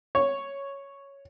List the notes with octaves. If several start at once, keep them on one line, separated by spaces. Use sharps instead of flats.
C#5